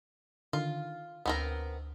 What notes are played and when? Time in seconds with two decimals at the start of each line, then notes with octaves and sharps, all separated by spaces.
0.53 D3 D#3 F4
1.26 D2 B3 C4 A#4